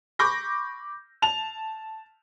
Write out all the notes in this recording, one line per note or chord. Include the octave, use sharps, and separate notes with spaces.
B5 C#6 D6 G6 A#6
A5 F7